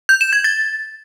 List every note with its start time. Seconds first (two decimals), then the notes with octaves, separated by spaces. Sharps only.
0.09 G6
0.21 E7
0.33 G#6
0.44 A6